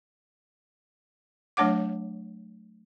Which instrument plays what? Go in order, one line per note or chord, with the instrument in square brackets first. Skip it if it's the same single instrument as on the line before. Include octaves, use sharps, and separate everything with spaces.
[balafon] F#3 A3 D4 C#5 F#5 D6